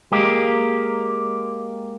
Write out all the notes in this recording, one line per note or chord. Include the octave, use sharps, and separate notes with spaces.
G#3 A#3 G4